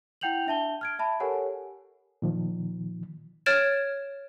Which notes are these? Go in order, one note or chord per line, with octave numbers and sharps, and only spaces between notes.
E4 F#5 G5 G6 F7 F#7
D4 E5 A5 G7
F6 G#6 D7
E5 A5 B5
G4 A4 A#4 C#5 F#5 G#5
A#2 D#3 F3
C#5 F6 G#6 A6 D7 E7